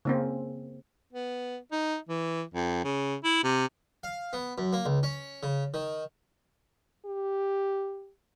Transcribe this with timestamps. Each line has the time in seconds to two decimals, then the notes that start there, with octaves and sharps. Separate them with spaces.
0.05 C#3 A#3 C4
1.13 B3
1.72 D#4
2.09 E3
2.54 F2
2.84 C#3
3.24 E4
3.44 C3
4.04 F5
4.33 B3
4.58 F#2
4.73 A#3
4.85 C#2
5.03 C#4
5.43 C#3
5.74 D#3
7.06 G4